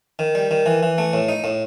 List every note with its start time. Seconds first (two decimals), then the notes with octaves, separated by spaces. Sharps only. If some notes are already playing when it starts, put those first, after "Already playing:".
0.19 D#3
0.35 G3
0.51 D#3
0.66 E3
0.83 E3
0.98 A3
1.13 A2
1.29 D#4
1.44 A2